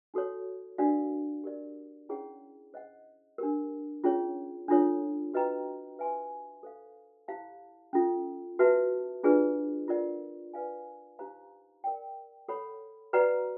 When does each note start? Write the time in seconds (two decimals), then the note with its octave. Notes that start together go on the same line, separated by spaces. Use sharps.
0.14 D#4 F#4 A4 C#5
0.78 D4 F#4 A#4 D5 F5
1.44 G4 A#4 D5
2.09 C#4 E4 G#4 C#5 F#5
2.74 C5 D#5 F#5
3.38 D4 G4 A#4
4.04 C#4 F4 G#4 C#5
4.68 D4 F4 A4 C#5
5.34 F#4 B4 D#5 G5 A#5
5.99 B4 E5 G#5 C6
6.63 A4 C5 F5
7.28 E4 G4 C5 F5 A5
7.93 C#4 F4 A4
8.59 F#4 B4 E5 A5
9.23 D4 F4 G#4 B4 D5
9.88 F4 A#4 D5 F#5
10.53 B4 D5 F5 G#5
11.19 D#4 G4 C5 F5 A#5
11.84 A#4 D5 G5
12.48 A4 C#5 F#5 B5
13.13 F#4 B4 D5 F#5 A#5